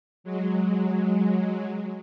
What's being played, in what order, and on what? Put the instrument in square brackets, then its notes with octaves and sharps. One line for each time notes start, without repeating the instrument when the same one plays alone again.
[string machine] F#3 G#3